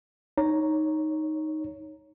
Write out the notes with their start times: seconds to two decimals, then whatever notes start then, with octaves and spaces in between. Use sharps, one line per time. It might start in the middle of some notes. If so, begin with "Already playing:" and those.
0.38 D#4 C#5 A#5